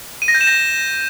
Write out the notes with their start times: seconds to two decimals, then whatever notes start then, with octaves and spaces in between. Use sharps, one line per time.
0.22 D#7
0.28 A#6
0.34 G6
0.41 E7
0.47 A#6